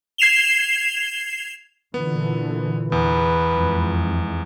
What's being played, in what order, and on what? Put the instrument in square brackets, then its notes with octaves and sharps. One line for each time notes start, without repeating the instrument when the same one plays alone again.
[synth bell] G#6 C7 E7 F7 G7
[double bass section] A#2 D3 E3 [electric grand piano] B3
[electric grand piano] E2 [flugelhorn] B4
[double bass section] F2 G#2